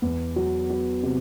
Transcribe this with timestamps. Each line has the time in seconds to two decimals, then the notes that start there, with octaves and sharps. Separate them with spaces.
0.02 E2
0.36 F#3
0.70 F#3
1.03 C3